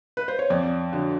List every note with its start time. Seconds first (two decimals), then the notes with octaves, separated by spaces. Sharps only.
0.17 B4
0.28 C5
0.39 C#5
0.50 F2 D5
0.92 D3 F#3